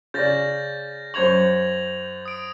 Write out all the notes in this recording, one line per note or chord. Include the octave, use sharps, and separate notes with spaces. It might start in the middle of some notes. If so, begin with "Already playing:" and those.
C#3 D5 G6 A6 A#6
F#2 C5 C#6 G#6 F7 F#7
D#6 D7